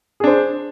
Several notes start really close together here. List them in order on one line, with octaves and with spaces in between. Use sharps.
G#4 D4 C5